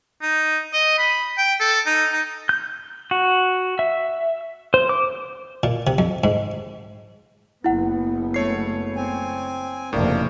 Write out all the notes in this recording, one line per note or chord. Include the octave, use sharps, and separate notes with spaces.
D#4
D#5
B5
G5
A4
D#4
D#4
G6
F#4
E5
C5
D6
A#2
C3
F2
G#2
F#1 B3 E4 F#5
A3 C#5 C7
C4 G#5
F#1 F2 A2 C3 A#3 D4 A#4